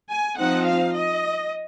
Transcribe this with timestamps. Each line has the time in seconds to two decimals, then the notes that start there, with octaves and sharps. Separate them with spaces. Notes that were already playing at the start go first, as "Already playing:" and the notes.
0.09 G#5
0.37 F3 C4 D#4 F#5
0.65 F5
0.94 D#5